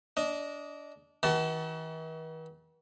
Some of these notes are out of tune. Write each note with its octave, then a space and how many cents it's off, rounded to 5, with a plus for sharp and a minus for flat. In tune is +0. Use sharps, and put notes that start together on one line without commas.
D4 -20 D#5 +0
E3 -45 F#4 +30 A5 +0